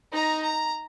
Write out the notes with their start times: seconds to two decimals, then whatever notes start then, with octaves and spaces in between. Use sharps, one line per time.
0.13 D#4 A#5
0.45 A#5